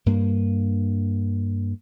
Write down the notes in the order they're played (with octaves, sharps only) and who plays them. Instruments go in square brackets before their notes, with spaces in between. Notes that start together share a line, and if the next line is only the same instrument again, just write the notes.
[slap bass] G2 A#3